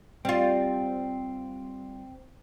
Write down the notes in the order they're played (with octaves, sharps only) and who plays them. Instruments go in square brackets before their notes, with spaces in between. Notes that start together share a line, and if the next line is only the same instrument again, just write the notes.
[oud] G3 F4 [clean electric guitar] C4